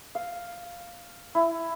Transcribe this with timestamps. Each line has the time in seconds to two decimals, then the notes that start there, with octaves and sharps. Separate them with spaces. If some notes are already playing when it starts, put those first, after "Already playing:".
0.15 F5
1.35 E4